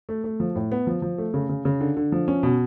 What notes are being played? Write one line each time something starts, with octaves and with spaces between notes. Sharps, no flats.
A3
A3
F3
A2
B3
F3
F3
A3
C#3
C#3
C#3
D3
D3
F3
C#4
B2